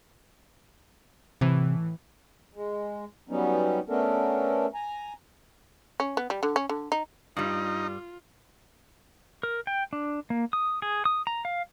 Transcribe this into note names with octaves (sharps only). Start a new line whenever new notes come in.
A2 C3 E3
G#3
F#3 G3 B3 C#4 D#4
A3 B3 C#4 D4 A4 A#4
G#5 A#5
C#4
B3
G3
D3
C#4
D3
D#4
G2 G3 D#4 F4
A#4
G5
D4
A#3
D#6
G#4
D#6
A#5
F5